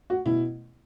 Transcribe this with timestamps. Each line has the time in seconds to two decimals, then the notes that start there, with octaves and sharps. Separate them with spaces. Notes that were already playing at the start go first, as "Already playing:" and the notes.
0.10 F#4
0.25 B2 E4